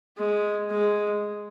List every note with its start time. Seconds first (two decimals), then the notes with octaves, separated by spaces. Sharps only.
0.17 G#3
0.70 G#3